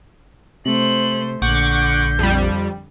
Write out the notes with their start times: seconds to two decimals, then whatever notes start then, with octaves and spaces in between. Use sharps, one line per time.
0.65 C3 A3 C5 F#7
1.42 A#1 D3 F#5 C#6 D6 G6
2.19 F2 G3